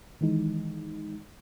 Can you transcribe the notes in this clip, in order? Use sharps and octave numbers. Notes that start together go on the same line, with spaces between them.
D#3 E3 G#3 D#4